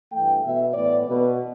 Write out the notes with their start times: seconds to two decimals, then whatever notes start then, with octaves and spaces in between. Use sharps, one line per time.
0.11 G2 E3 A3 G5
0.43 B2 B3 E5
0.74 A2 E3 B3 D5
1.06 B2 B3 B4